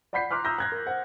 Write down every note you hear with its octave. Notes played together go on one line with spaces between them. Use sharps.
D5 F#5 B5 G6 B6 C7
A#5 C6 D6 F6 F#6
A#5 D#6 E6 G6 A#6
F#6 G#6 A#6
A#4
C5 F#5